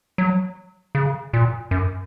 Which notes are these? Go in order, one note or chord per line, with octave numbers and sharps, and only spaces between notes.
F#3
C#3
A#2
F#2